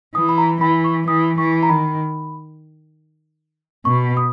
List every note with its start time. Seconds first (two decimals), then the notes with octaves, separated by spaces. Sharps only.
0.15 E3 D#6
0.29 B5
0.38 A#5
0.61 E3 B5
0.84 C#6
1.07 E3 D#6
1.38 E3 C#6
1.63 A#5
1.69 D#3 B5
3.85 B2 C#6
4.17 D#6